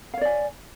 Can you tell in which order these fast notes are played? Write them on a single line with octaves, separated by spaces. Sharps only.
F5 C#5 D5 G#5